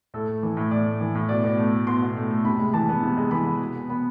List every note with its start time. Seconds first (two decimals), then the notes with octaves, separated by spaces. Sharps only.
0.14 A2 A4
0.28 A3
0.43 E3
0.57 A2
0.71 A2 D5
0.86 A3
1.01 E3
1.15 A2
1.29 B2 D5
1.44 B2 D5
1.58 A3
1.73 A3
1.87 B2 C6
2.02 B2
2.16 A3
2.31 A3
2.45 C3 B5
2.59 G#3
2.74 E3 A5
2.89 B3
3.03 C3
3.17 G#3
3.31 E3 B5
3.47 B3
3.60 B2
3.75 B2
3.89 B3 B5